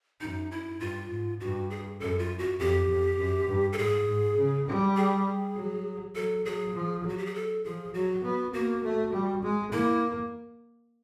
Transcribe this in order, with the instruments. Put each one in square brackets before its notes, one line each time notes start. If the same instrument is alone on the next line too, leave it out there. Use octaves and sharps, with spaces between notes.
[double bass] F#2 [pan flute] D#4
[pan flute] E4
[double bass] G2 [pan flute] F4
[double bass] G#2
[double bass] G2 [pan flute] F#4
[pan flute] G#4
[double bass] F#2 [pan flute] A4
[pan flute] F4
F#4
[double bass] F2 [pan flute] G4
[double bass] F2
F#2
G2
[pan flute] A4
[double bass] G#2 [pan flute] G#4
[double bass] G#2
C#3
G3
[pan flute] G#4
[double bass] F#3
[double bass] F#3 [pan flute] A4
[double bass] F#3 [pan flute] G#4
[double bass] F3
[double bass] F#3 [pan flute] F#4
[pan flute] G4
G#4
A4
[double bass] F3 [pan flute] G#4
[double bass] F#3 [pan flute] F#4
[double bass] B3
[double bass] A#3 [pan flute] F#4
[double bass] A3
G3
G#3
[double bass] A#3 [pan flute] E4